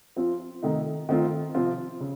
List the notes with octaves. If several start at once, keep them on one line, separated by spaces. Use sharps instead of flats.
F3 C4 F4
C3 D#3 A3 D#4
D#3 A3 C4 F4
C3 F3 C4 F4
C#3